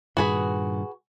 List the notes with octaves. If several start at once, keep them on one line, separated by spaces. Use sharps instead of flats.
G2 A#2 D#3 F#4 G#4 B4